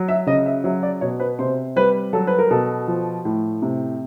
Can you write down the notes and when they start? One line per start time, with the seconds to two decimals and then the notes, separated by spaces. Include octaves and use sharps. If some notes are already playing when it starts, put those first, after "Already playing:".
Already playing: F#3
0.08 E5
0.27 C#3 D#5
0.46 E5
0.64 F#3 E5
0.83 D5
1.01 B2 C#5
1.20 B4
1.39 C3 C5
1.76 G3 B4
2.13 F#3 A4
2.27 B4
2.39 A#4
2.51 B2 A4
2.87 F3
3.25 A2
3.62 C3